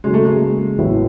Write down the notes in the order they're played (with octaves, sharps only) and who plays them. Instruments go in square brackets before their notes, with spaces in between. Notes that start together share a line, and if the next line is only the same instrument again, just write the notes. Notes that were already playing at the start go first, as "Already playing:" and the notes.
[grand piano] C#3 F#3 A#3 [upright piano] G#3
[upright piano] A3
G#3
[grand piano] A1 A2 F#3 B3 E4